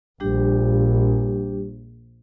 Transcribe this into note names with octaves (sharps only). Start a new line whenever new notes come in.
A#1 G3 D4 G4